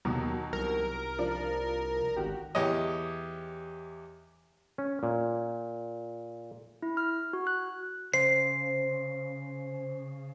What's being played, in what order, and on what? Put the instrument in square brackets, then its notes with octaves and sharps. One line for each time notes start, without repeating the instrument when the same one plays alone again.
[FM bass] D#2 [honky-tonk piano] B2 D#3 F#3
[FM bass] C2 [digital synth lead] A#4
[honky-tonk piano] F3 D4
[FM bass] G#1 [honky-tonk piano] F#4 G4
[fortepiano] E2 G4 C#5 D#5
[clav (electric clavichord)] C#4
A#2
[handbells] E4
F6
F#4
F#6
[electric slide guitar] C#3 [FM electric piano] C5 [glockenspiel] C7